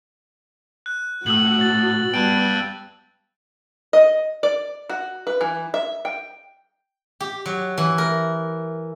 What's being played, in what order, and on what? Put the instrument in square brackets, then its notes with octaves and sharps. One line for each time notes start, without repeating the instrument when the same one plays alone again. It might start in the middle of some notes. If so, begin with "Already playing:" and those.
[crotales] F#6
[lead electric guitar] A2 [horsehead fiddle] F#4 [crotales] E6 F#7
[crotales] A6
[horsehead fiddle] G3 B3 [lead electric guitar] G5 A5 [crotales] F#6 D7
[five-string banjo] D#5
D5
F#4
B4
E3
E5
G5
[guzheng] G4
F#3
E3
A#4